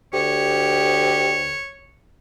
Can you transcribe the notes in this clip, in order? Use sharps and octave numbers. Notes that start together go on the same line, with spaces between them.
D2 G4 C#5